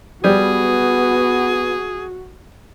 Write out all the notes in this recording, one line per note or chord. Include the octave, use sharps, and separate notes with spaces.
G3 B3 F#4 G#4